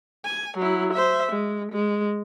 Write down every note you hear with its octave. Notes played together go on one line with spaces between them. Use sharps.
G#5
F#3 E4
C5 E5
G#3
G#3